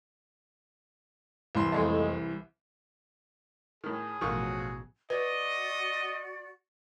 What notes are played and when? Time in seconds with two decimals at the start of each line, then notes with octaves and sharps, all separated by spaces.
1.55 C2 E3 C6
1.72 F2 G#3 A3
3.84 A2 D#3 G#4
4.21 A1 F2 B2 D#3 F3 F#4 C#6
5.10 F#4 B4 D5 D#5